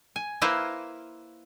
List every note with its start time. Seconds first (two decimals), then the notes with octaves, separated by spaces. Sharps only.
0.16 G#5
0.42 A#3 E4 B4 C5 F5 A#5